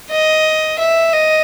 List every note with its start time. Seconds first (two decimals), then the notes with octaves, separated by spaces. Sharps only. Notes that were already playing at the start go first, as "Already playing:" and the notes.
0.10 D#5
0.79 E5
1.13 D#5